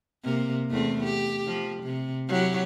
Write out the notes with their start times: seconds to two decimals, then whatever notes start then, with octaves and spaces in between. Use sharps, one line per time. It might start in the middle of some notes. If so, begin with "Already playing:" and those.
0.24 C3 A#3
0.70 E2 A3 C4
1.04 G4
1.47 F3
1.83 C3
2.29 F#3 E4 G4